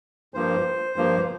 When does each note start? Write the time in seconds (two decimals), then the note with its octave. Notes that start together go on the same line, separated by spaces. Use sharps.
0.34 G2 F3 A#3 C5
0.96 G2 F3 A#3